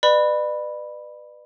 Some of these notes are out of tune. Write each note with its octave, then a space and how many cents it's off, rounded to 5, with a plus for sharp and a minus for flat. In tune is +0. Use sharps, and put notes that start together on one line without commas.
B4 +0 D5 +40 B5 +0